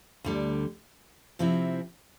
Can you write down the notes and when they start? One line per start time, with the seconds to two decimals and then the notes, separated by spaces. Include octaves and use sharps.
0.24 D2 D3 G3
1.39 C3 F3 C4 E4